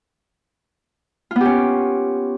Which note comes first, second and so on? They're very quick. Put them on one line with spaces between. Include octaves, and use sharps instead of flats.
F4 B3 G4 C#4